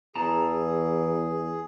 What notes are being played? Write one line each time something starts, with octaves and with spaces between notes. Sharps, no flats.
E2 E3 G#4 A5 A#5